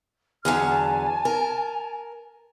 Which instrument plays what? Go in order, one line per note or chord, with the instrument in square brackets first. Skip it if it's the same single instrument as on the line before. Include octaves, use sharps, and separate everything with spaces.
[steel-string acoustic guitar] E2 D3 F#3 [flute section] G#4 F6
[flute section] G#5 A5
[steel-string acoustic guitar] A#4